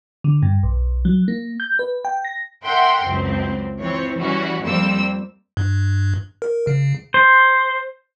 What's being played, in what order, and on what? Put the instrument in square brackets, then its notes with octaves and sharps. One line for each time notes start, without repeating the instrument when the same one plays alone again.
[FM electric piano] D3
G2
B1
F#3
A#3
G6
B4
G5
A#6
[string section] A#4 E5 F#5 G5 C6
C#2 F#2 C4
E3 F3 C4 C#5
E3 G3 C#4 F#4
F2 G3 A#3 C4 E6
[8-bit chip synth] G2
A#4
C#3
[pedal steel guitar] C5